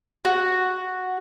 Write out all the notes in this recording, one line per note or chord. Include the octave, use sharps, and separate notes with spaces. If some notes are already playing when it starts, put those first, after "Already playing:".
F#4